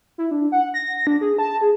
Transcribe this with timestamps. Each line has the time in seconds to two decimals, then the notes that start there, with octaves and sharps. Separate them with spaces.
0.18 E4
0.31 D4
0.52 F#5
0.74 A#6
1.07 D4
1.21 G#4
1.38 A5
1.61 G#4